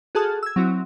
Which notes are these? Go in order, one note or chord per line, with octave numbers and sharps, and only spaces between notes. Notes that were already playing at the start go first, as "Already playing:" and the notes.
F#4 G#4 A4 A5 D#6 F6
E6 G#6
F#3 C4 E4 F#4